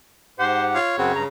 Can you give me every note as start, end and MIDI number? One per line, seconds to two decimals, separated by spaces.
0.39 0.78 44
0.39 0.78 67
0.39 0.65 72
0.39 0.78 78
0.75 0.94 65
0.75 1.20 73
0.98 1.12 42
0.98 1.28 49
0.98 1.12 60
0.98 1.12 66
1.15 1.24 43
1.15 1.24 82